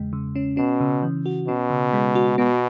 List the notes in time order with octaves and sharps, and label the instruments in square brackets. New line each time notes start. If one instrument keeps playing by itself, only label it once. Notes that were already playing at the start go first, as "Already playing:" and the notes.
Already playing: [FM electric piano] E2 C#3 G#3
C#3
C#4
[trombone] B2 [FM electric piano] C#4
[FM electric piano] C#3
E3
F#4
[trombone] B2 [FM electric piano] C#4
[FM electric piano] C#3
G#3
F#4
[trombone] B2 [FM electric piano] B3